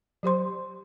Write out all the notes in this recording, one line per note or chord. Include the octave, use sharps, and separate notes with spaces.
F#3 G4 C5 C6